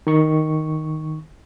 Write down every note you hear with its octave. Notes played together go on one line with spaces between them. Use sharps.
D#3 C#6